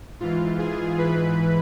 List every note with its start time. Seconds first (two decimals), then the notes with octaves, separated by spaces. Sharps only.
0.20 G#2 E3 F4
0.59 G#4
0.98 G#2 E3 B4